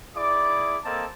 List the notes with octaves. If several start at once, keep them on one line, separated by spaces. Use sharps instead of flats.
E4 G#4 D5 D6
A#3 C4 A4 D#5 A5